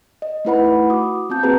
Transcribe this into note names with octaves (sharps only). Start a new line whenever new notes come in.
D#5
A3 D#4 E4 B4 F#5 B5
F#4 D6 D#6
B3 C4 F4 A5 G6
A#3 C4 F#4 G#4 B4 A#5